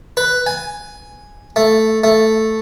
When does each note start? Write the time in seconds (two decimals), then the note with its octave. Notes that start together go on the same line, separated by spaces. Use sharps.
0.17 B4
0.47 G#5
1.56 A3
2.04 A3